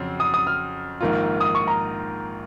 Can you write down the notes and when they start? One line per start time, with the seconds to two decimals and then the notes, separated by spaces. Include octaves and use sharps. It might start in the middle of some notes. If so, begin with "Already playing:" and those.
Already playing: F2 C#3 F#3 C4 F#4
0.20 D#6
0.34 D#6
0.47 F6
1.01 A#1 G#2 D#3 A#3 F4
1.41 D#6
1.55 C#6
1.67 A#5